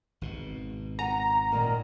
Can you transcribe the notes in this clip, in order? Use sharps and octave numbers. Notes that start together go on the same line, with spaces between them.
G#1 B2
F#5 G#5 A#5
A#2 D#3 A#3